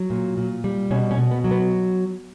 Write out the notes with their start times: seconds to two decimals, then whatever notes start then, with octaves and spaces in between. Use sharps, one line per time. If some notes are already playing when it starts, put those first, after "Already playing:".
Already playing: F#3
0.10 A#2
0.37 A#2
0.64 G3
0.91 B2 C#4
1.11 C#4
1.18 B2
1.31 B3
1.44 F#3
1.51 B3